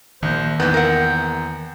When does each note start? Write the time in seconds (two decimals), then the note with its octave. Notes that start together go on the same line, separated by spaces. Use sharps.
0.23 A#1 D#3 A#3 C5
0.60 E2 G#2 B3 G5
0.74 A#4 F#5